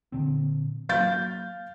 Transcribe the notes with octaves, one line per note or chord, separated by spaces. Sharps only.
A#2 D3 C4
F#3 A#3 F5 G6 A6